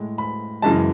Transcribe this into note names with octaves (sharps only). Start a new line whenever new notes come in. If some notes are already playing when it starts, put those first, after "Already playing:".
Already playing: A2 G#3
B5
F#2 C#3 E3 G#3 A5